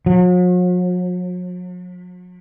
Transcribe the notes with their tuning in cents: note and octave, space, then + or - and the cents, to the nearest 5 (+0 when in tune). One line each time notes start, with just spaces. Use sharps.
F#3 -45